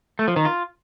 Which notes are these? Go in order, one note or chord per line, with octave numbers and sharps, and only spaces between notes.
A3
F3
D#3
F4